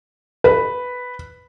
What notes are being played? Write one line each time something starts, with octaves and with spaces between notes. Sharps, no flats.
B4